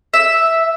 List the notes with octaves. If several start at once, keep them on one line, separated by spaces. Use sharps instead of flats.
E5